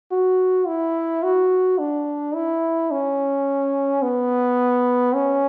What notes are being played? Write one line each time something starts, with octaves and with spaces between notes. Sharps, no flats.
F#4
E4
F#4
D4
E4
C#4
B3
C#4